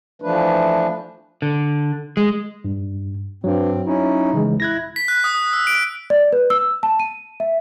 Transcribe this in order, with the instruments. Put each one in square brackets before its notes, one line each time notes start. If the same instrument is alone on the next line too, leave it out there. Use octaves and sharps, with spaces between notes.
[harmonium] E3 F3 A3 D4 B4
[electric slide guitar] D3
G#3
[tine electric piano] G2
[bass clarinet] G2 [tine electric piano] F#3 [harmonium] C4
[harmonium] C#4 E4 [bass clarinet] D#4
[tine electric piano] C#3 E3 G#3
[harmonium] E4 [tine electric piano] F#6 G#6 A#6
[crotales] B6
F#6
D#6
E6
D7
[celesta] D5
B4
E6
A5
D#7
E5